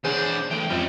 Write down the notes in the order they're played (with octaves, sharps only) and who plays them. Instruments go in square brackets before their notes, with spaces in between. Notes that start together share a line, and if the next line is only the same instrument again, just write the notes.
[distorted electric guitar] E2 D4 [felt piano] G#4 C#5 [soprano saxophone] C5
[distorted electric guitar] E3 A3 [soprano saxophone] G5
[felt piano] F2 [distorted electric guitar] C#4 E5